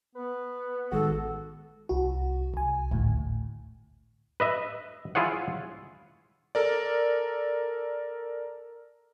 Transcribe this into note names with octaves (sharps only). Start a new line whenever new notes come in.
B3 B4
A1 D#3 G#3 F#4 A4
C2 F#4
C2 G#5
G#1 D2 A2
B4 D#5 E5
E4 F4 G#4 C#5 F#5
A4 A#4 D5